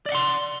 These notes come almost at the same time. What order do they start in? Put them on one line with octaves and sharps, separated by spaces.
D5 D#5 F#5 C6